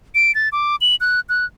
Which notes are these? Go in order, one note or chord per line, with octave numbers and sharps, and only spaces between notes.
D7
A6
D6
F#7
F#6
F#6